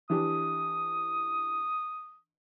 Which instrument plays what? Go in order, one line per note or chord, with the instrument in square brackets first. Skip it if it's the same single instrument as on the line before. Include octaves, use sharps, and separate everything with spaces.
[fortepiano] E3 D4 G4 [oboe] D#6